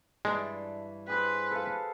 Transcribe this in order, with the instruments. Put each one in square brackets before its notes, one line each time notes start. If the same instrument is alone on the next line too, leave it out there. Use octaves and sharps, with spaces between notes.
[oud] G2 E3 D4 [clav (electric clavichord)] G#3
[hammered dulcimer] G4 G#4 C5 [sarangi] B4
[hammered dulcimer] A4 F5